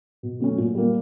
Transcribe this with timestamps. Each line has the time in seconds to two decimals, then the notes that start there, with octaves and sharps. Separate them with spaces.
0.23 B2
0.40 F#3 A3 C#4
0.58 A#2
0.75 G3 A#3